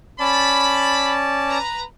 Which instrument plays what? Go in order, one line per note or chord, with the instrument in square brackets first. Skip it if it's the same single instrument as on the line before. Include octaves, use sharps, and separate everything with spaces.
[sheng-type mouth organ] C#4 D5 A5 [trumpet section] B5
[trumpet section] B4 A#5